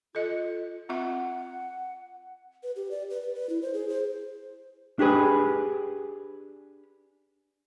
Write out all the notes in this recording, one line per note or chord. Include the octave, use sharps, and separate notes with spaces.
F4 A4 D#5
C4 F4 E5 F#5
B4
G4
D5
B4
B4
B4
E4
C5
G#4
C5
D4 G4 G#4 B4